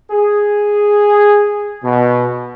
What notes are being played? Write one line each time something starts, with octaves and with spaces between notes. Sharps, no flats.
G#4
B2